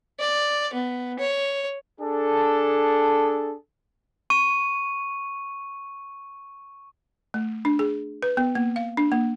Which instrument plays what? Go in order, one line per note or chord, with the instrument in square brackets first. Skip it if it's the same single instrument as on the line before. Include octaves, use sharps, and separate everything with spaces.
[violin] D5
B3
C#5
[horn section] D4 G#4 A4
[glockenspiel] C#6 D#7
[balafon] A3
D4
G#4
B4
B3
A#3
F5
D4
A#3